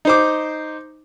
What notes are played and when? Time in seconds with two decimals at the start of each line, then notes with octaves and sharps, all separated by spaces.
0.05 D#4 C5 D6